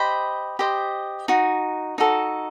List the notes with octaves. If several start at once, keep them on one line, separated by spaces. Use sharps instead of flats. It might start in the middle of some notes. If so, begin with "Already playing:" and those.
Already playing: G4 C5 D#5 B5
G4 C5 D#5
D#4 F#4
D#4 F#4 A4